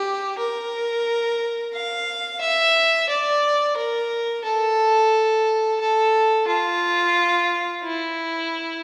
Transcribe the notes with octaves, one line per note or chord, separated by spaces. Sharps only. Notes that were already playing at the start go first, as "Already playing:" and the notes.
Already playing: G4
A#4
F5
E5
D5
A#4
A4
A4
F4
E4